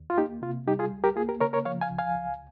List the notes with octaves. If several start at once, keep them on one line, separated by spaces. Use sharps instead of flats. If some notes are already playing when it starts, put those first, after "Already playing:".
Already playing: D#2
F4
A#3 D#4 G4
C3 F4
G3 D#4 G4
F4 G#4
C#2
G4 A#4
A#3 F4 G#4
G4 A#4
C#3 A#4 C#5
A#4 C#5
F3 C#5 F5
F5 G#5
C#2
F5 G#5
C#2